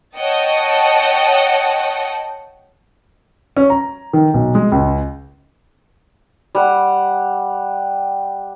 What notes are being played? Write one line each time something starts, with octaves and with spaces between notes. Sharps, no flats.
C#5 D#5 F#5 G5 A5
C#4
A#5
D#3
B1
G#3
C#2
G3 F#5